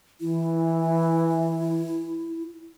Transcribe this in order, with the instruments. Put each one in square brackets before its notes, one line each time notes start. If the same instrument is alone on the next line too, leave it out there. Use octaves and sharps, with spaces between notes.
[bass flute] E3 [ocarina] E4